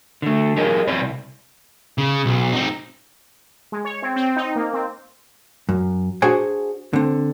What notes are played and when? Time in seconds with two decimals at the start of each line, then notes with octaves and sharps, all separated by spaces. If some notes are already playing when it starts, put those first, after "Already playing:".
0.22 D3 A3
0.56 F#3 G4 G#4 A#4 D#5
0.87 F#2 B3 C4 B4 D5
1.01 C2
1.98 C#3
2.26 B1
2.53 C4 D#4
3.72 G#3
3.85 C#5
4.02 C4
4.16 C4
4.36 D#4
4.56 A#3
4.74 C4
5.69 F#2
6.22 D4 F#4 G#4 C5 F#5 G#5
6.93 D3 C4